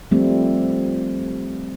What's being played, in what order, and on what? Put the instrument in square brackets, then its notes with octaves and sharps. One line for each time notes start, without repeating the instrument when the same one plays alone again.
[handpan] F3 G3 A3 C4